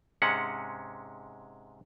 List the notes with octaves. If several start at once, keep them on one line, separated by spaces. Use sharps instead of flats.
G#2 C3 G#3 C#4 F#5